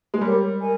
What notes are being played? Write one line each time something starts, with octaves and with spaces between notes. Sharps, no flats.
G#3
G3 G4 A#4 C#5
A#4 D#5 G#5